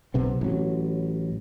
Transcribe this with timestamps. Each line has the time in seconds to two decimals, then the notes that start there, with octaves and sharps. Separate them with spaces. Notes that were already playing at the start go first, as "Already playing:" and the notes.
0.14 B1 C3 B3
0.41 A1 F#3